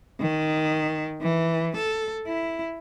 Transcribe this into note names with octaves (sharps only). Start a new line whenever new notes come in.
D#3
E3
A4
E4